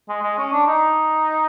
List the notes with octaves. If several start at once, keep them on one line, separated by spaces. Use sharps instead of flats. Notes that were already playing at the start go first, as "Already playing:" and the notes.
G#3
G#3
C#4
D4
D#4